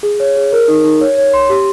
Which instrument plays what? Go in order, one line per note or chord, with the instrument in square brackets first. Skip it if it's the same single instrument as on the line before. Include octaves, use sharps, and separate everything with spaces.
[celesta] G#4
C#5
G#4
A#4
D#4
D#4
C#5
C#5
C6
G4